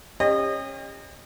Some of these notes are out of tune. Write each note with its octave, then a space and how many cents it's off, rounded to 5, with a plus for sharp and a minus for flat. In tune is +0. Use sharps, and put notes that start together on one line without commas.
C#4 -20 G4 +35 D#5 -25